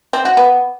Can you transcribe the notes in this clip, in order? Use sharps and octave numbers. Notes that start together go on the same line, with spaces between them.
C4
F#4
B3